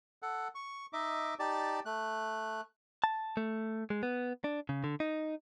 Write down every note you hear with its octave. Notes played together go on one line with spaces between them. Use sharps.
A4 F#5
C#6
D#4 D#5 E5 D6
D#4 G4 D5 A5
A3 F#6
A5
A3
G#3
B3
D4
C#3
D3
D#4